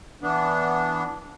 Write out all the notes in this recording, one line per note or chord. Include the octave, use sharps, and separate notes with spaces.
E3 B3 D4